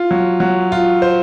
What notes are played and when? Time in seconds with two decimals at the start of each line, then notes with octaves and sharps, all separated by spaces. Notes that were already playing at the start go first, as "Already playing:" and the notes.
Already playing: F4
0.11 F#3
0.40 F#3
0.72 F4
1.02 C5